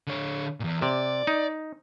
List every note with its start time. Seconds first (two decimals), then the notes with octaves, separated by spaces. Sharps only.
0.07 D3 C#5
0.60 E2 A#2
0.82 C3 D5
1.27 D#4